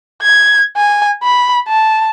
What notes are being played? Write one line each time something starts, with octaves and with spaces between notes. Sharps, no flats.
G#6
G#5
B5
A5